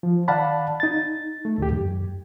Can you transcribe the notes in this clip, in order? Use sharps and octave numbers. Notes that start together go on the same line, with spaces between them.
F3
D#3 D5 F5 F#5 A5 B5
D#4 A6
A3
D2 A#2 D#3 G4
F#2